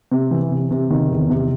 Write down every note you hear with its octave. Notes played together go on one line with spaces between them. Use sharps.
C3
E3
C3
C3
D#3
E2
C3